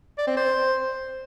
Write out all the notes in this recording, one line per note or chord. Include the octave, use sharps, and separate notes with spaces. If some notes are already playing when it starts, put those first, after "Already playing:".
D5
C4
C5